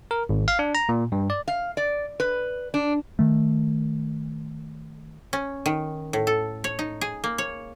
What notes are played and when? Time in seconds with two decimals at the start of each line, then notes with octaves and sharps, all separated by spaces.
0.11 A#4
0.29 G#1
0.48 F5
0.59 D4
0.75 A#5
0.89 A#2
1.12 G2
1.30 D5
1.48 F5
1.77 D5
2.20 B4
2.74 D4
3.19 D#3 A3
5.33 C#4
5.66 D#3
6.13 A2
6.27 A4
6.64 C#5
6.79 D#4
7.01 G#4
7.24 A#3
7.38 C#5